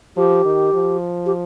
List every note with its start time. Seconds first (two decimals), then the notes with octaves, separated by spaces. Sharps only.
0.17 F3 G4
0.45 D#3
0.74 F3
1.26 G4